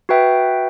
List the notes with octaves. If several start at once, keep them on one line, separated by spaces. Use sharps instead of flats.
F#4 B4 E5 G5